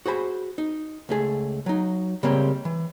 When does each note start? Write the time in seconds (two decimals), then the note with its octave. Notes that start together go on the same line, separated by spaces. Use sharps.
0.06 F#4 G#4 C5 B5
0.58 D#4
1.09 C#2 A3 G#4
1.66 F#3 D#4
2.23 C#3 G3 G#3 A#3 C4
2.65 E3